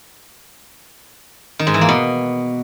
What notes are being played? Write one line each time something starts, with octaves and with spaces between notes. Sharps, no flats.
D#3
G#2
E3
A#3
B2